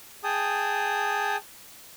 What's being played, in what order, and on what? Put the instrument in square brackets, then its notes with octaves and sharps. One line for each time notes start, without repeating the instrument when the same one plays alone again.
[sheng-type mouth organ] G#4 G5 A5 D#6